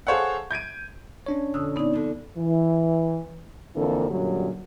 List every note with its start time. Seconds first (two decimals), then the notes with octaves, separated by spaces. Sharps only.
0.07 G#4 A4 C5 C#5 F5 F#5
0.51 G6 G#6 D7 D#7
1.26 C#4 D4 C#5
1.54 F2 A#2 D3 D#6 E6
1.76 A#2 B3 C4 D#4 D5
1.93 D3 F3
2.36 E3
3.75 F2 D3 E3 A#3 A4
4.10 F#2 A#2 D3 F#3 G3